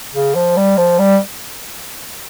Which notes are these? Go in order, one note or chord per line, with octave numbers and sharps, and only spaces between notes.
C#3
F3
G3
F3
G3